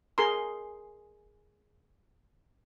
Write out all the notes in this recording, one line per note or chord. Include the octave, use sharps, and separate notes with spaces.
G#4 A#4 A#5 C6